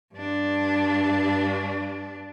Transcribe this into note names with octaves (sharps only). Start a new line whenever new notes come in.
G2 D4